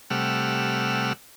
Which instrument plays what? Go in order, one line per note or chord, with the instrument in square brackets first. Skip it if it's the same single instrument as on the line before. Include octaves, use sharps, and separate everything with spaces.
[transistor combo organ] C3 G3 A3 F#5 E6 F6